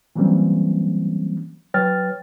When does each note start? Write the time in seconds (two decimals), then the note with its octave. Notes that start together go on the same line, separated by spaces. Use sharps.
0.16 E3 F#3 G3 A#3 C4 C#4
1.74 F#3 B4 C#5 G5 F6 A6